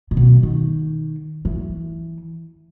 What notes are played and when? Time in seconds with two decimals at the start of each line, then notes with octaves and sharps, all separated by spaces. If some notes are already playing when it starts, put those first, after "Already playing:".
0.11 A#2
0.17 B2
0.43 D#3
1.45 E3